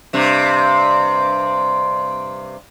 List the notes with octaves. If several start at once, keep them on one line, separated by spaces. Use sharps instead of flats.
G2 C3